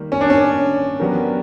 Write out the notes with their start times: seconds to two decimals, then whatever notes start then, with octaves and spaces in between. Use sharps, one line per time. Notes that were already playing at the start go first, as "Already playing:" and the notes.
Already playing: D#3 G3 A#3
0.12 C#4
0.21 D4
0.30 C#4
1.00 F#3 B3 D4 G4 A#4